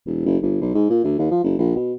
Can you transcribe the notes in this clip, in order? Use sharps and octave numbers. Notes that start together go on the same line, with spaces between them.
E1
F#1
G1
B1
G#2
A#2
D2
D#2
F3
F#1
A#1
B2